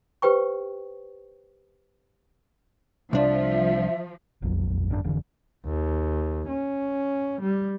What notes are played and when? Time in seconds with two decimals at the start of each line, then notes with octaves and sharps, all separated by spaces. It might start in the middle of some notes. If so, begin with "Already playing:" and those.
0.22 G4 B4 C5 G5 C#6
3.13 C2 F3 D4 E5
4.42 E1 A#1 F2 F#3
4.90 G#1 F#2 B2 D4
5.04 F1 D3 E3
5.65 D#2
6.48 C#4
7.41 G3